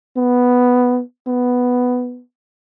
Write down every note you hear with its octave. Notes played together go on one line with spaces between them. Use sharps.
B3
B3